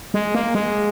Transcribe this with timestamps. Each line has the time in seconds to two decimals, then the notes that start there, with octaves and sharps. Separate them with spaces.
0.14 G#3
0.35 A#3
0.55 G#3